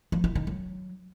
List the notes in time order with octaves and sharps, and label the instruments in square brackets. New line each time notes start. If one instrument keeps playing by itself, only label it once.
[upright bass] F3
E4
D#3
F#3